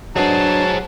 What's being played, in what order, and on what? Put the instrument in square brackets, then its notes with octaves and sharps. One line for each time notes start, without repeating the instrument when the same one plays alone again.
[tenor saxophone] F#3 [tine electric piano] D4 B4 D#5 [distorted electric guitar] G#4 C5 [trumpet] A5